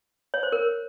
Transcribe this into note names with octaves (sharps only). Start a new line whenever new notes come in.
C#5
C5
A#4